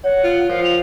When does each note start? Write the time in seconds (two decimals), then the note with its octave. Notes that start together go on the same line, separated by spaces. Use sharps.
0.04 C#5 F#5
0.24 F4
0.49 F3 A#4 F5
0.64 G5 F7